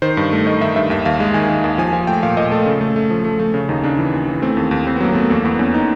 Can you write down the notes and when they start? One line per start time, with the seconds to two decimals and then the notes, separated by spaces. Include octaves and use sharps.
0.02 D#3 C5
0.17 G2
0.32 A3
0.46 D#3 D#5
0.61 D#3 E5
0.76 G2 E5
0.90 D#2 E5
1.05 D#2 F5
1.20 G#3
1.34 D#3 G#5
1.50 D#3
1.64 D#2
1.78 F3 G#5
1.93 F3 G#5
2.07 A3 G5
2.23 A#2 F5
2.37 A#2 D#5
2.51 A3 A4
2.66 C#3
2.81 A3
2.96 A3
3.10 F3
3.24 A3
3.40 A3
3.54 C#3
3.69 D#2 D#4
3.84 C#3 D4
3.99 E3
4.13 D#2
4.28 E3
4.42 A3 C4
4.57 D#2
4.71 D#2
4.87 D#2 C4
4.96 B3
5.01 F#3 A#3
5.13 A3 B3
5.30 E2 A#3
5.44 E2 B3
5.59 E2 C#4
5.74 D#4